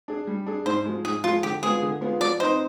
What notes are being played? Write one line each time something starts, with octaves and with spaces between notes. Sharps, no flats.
D4 G#4
G3
D4 G#4
G#2 C5
F3 G#3
G#2 G#4
F3 G#3 F4
D3 G4
G#3 B3 F4 G#4
D3
G#3 B3 F4
F3 D5
C4 D#4 B4 C5 D#5